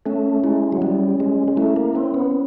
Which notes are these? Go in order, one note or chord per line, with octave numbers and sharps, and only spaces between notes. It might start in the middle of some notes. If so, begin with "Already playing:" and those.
A3 C#4
G#3 E4
F#3
G3 C#4
G#3 C#4
G#3
A3 E4
A#3
C4 C#4
B3